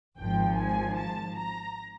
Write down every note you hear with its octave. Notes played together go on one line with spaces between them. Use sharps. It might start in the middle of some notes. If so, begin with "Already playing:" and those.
G#1 G#2 F3 G5
G#5
A5
A#5